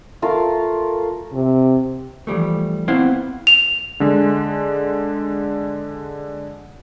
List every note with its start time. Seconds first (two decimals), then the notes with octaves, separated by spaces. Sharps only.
0.22 A3 F4 A#4 F5
1.32 C3
2.27 E3 F3 G3 A3
2.88 B3 C4 E4 C5 F5 F#5
3.47 F7
4.00 D3 G#3